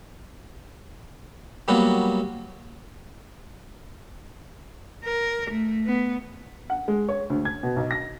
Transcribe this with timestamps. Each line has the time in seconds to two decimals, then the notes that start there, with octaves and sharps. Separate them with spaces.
1.68 F#3 G3 A#3 B3 F#4
5.04 A#4
5.50 A3
5.86 B3
6.70 F#5
6.88 G#3
7.09 C#5
7.30 D2
7.45 G#6
7.63 B2
7.76 B1
7.91 A#6